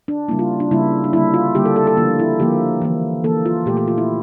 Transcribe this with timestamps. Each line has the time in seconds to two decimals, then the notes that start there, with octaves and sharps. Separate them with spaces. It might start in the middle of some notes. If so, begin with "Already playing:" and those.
0.08 D4
0.28 A#3 E4
0.31 C#3 G3
0.39 F4
0.60 D4
0.71 C#3 G3 A#3 E4
1.04 D4
1.13 D3 G3 A#3 E4
1.34 F4
1.55 D3 G3 A#3 G4
1.65 A4
1.76 A4
1.87 A4
1.97 D3 F3 A#3 F4
2.19 E4
2.39 D3 F3 A#3 G4
2.82 E3 A#3
3.24 E3 A#3 A4
3.46 F4
3.66 A#2 A3 G4
3.77 G4
3.88 F4
3.98 E4